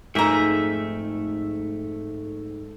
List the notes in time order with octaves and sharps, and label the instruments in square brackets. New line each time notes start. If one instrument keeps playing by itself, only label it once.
[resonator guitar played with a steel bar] F2 A#4 A#5 [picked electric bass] G#2 [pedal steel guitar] A3 E5 [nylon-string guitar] D#4 G#4